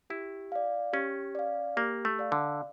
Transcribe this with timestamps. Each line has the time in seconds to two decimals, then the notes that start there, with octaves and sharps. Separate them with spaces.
0.10 E4 G4
0.52 D5 F5
0.93 C#4 G4
1.35 D5 F5
1.77 A#3 G4
2.05 A3
2.19 D5 F5
2.32 D3